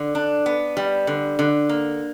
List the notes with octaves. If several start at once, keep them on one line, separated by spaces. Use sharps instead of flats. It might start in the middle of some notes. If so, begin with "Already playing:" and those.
Already playing: D3
D4
B3
G3
D3
D3
A#3